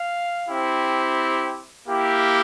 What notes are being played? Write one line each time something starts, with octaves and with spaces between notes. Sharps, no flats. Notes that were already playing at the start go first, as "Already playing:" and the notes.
Already playing: F5
C4 E4 G4
A#3 E4 G4